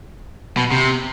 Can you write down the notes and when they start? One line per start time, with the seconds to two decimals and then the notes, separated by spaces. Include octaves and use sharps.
0.57 B2
0.72 C3